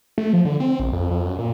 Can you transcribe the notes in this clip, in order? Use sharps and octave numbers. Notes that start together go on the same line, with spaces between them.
A3
F3
D3
C4
A#1
F2
F2
F#2
A#2